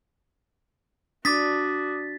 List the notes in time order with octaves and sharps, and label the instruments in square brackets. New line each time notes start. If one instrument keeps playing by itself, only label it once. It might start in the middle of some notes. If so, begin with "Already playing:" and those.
[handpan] D4 [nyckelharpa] F#4 [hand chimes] D6 D#6 [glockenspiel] A6 B6